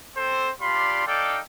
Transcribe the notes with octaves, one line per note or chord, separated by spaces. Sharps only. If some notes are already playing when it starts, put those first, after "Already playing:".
C4 A4 C5
D4 F4 G4 D5 B5 C6
D#4 A4 D5 F5 G5